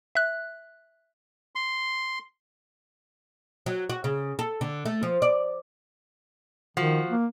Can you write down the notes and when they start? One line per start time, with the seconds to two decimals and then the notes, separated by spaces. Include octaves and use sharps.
0.15 E5 F#6
1.55 C6
3.66 F#3
3.90 F#4
4.04 C#3
4.39 A4
4.61 D3
4.86 A3
5.03 F3
5.22 D5
6.77 D#3 F3 F#4
7.09 A#3